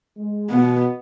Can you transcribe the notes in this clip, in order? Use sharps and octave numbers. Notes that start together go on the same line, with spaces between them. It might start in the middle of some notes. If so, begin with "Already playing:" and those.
G#3
B2 B3